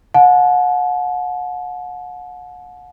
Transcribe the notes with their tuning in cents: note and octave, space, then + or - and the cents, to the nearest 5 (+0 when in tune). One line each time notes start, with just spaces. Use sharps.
F#5 -35 A5 -40